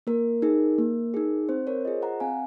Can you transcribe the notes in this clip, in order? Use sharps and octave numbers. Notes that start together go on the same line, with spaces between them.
A#3 A#4
D#4 G#4
A#3
D#4 G#4
C4 C5
A#4 C#5
F4 G#4 C5 D#5
F#5 A#5
C4 F5 G#5